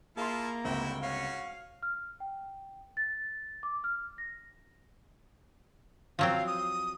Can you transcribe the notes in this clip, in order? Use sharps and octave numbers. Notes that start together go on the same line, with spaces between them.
A#3 E4 F4 G#4 A5 C6
G1 C#2 C4 E4 F#4 G5
C#4 F#4 F5
F6
G5
A6
D6
F6
A#6
F3 F#3 C4 F5
D#6